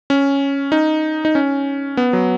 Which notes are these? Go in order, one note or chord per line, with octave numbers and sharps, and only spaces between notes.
C#4
D#4
D#4
C#4
B3
F#3